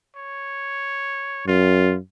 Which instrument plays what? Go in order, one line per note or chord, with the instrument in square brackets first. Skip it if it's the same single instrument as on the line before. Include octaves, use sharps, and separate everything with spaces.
[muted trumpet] C#5
[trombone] F#2 [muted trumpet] F4